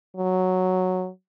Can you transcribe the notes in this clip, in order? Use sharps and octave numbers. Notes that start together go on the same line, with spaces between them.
F#3